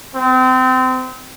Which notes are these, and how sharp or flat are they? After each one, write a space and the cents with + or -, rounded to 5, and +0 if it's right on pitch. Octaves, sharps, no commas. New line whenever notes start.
C4 -30